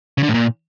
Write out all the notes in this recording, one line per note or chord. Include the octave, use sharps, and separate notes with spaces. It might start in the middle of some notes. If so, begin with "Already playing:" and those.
C#3
D3
A2
A#2